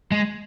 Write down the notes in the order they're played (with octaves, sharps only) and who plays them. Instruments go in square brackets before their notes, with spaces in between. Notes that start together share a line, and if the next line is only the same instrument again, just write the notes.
[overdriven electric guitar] G#3